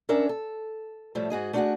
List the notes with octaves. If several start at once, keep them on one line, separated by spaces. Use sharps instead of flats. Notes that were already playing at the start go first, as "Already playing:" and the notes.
C#4 D4 A#4 C#5 E5
A4
A2 F3 G3 A3
G#2 F#4 G#4 D#5
A3 D4 F4 F#4 G#4 F#5